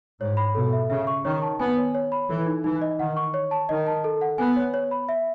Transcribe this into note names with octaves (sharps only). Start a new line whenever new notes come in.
G#2 C#5
B5
B2 A4
E5
C#3 E5
C#6
D#3 C#5
A5
B3 G#5
C#5
C#5
B5
E3 A4
D#4
E3 D#4
D#5
D#3 F#5
C#6
C#5
A5
D#3 D#5
A5
A4
F#5
B3 G#5
C#5
C#5
B5
E5